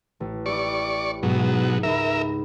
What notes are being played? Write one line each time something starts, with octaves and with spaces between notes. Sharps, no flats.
A1
E4 G4 D5 C#6
G#2 B2 F#3
C#2 D#4 A#4 E5 B5